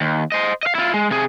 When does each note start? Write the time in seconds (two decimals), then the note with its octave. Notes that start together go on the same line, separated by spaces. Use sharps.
0.01 D#2
0.32 C5 D#5
0.63 D#5 F5
0.75 E4 F4
0.94 G#3
1.11 C3 G#4